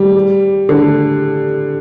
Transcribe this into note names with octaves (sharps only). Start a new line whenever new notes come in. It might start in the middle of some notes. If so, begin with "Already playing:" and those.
Already playing: G3
D3